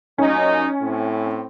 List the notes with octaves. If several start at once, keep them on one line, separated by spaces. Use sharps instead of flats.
F#2 A#2 C#4 D#4
A2 C4